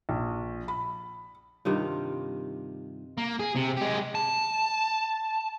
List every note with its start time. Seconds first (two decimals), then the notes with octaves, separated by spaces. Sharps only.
0.09 A#1
0.68 B5
1.65 G2 C3 D#3 F4
3.18 A#3
3.39 G#4
3.56 C3
3.77 G#3 G4
4.15 A5